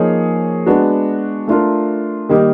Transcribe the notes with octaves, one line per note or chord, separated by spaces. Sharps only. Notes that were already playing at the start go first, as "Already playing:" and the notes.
Already playing: F3 A#3 D#4 G#4 C#5
G#3 B3 D4 F#4
A3 D4 F4 A#4
D#3 G3 A#3 D#4 G4